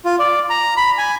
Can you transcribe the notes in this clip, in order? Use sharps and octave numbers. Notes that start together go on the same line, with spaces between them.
F4
D5
A#5
B5
G#5